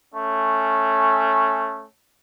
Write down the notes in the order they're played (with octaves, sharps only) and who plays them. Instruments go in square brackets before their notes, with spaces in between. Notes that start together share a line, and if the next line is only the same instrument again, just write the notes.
[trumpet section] A3 C#4